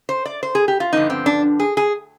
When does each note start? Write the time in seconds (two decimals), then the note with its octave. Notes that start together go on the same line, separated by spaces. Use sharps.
0.09 C5
0.25 D5
0.43 C5
0.55 G#4
0.68 G4
0.80 F4
0.93 G2 D3 F3 B3 D#4
1.10 C4
1.26 D4
1.60 G#4
1.77 G#4